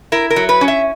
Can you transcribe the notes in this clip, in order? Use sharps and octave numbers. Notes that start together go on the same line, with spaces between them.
E4 A#4
A#4
F#3
B4
C#4
E5